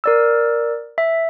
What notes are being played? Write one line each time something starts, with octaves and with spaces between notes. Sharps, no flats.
A#4 D5 E6
E5